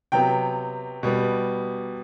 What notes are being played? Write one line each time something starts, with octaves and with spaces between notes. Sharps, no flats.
C3 F#3 B3 G5
B2 G3 B3